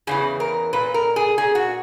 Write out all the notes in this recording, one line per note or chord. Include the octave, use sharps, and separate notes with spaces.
E2 C#3 E3 G#4
A#4
A#2 B4
A#4
G#4
A#2 G#4
F#4